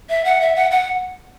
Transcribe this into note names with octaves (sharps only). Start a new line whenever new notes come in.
E5
F#5
E5
F#5
F#5